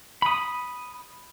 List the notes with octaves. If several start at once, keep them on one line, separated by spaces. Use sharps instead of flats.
B5 D#6